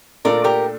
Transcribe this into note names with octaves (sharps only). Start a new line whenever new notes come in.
A#2 A3 D4 F4 A4 A#4 D5
G4 A#4